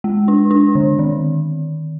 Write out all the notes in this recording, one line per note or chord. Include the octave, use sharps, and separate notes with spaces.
G#3
D4
D4
D3
D#3